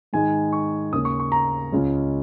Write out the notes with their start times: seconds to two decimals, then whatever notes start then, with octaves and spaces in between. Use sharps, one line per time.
0.13 G#2 D#3 G#3 D#4 G#5
0.53 C#6
0.92 D#2 C#3 A#3 C#4 D#6
1.05 C#6
1.19 C#6
1.32 A#5
1.72 C#2 C#3 G#3 C#4